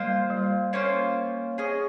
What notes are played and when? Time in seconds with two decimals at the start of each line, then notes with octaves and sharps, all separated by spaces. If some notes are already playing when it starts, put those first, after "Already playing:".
Already playing: G3 A#3 F4 C5
0.30 G3
0.73 A#3 C#4 F4 C5
1.58 C#4 G#4 D#5